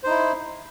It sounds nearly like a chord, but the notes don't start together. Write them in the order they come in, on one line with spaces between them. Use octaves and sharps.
C5 D#4 E4